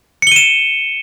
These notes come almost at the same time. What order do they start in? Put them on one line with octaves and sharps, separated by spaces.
C#7 G7 D#7 E7